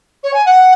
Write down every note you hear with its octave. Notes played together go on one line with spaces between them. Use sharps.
C#5
G#5
F#5